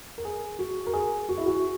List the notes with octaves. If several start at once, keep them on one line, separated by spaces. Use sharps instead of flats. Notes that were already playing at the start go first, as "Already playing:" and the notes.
A#4
G#4
F#4
A#4
G#4
F#4
E4
F#4